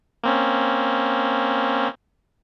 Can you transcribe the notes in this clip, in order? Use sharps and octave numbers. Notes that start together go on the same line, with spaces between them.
A#3 C4 C#4